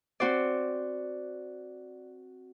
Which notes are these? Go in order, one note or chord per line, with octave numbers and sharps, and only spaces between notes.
C4 F#4 C5 D5